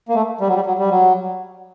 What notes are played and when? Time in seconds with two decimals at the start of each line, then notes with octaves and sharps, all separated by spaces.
0.09 A#3
0.15 A3
0.41 G3
0.47 F#3
0.56 G3
0.66 F#3
0.79 G3
0.91 F#3